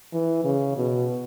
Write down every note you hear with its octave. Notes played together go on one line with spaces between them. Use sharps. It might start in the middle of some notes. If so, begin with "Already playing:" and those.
E3
C#3
B2